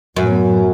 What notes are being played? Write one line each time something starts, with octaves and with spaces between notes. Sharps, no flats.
F#2 A2 F#3 B3